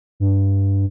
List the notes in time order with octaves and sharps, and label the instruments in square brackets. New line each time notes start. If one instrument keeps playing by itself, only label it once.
[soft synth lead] G2